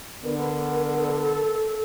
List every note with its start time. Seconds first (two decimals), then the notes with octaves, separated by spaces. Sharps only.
0.24 D3 B3 A#4
0.90 A4